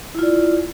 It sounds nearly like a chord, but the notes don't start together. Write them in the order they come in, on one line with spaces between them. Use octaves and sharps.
E4 F4 D5